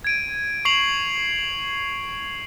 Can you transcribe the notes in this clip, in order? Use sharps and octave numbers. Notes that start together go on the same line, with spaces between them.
G#6 D7 D#7
C#6 C7 F7 F#7